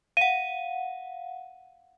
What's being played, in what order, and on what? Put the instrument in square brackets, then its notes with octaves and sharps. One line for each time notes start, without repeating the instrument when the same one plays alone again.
[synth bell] F5 F#5 [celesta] D#7